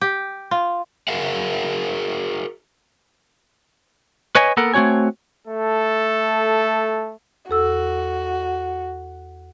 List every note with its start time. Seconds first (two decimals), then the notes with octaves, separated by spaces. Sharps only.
0.01 G4
0.51 F4
1.08 F#4 G#4 A#4 F5 F#5
4.35 B4 C#5 D#5 G#5
4.57 A#3 B3 A4 A#4 F#5
4.74 A3 C4 F#4 C#5 G#5
5.47 A3 A4
7.49 E2 F#4 A4 E6